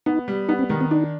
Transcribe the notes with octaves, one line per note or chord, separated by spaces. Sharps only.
B3 D#4
G3
B3 D#4
C4
D#3 G#3
C4
D4 D#4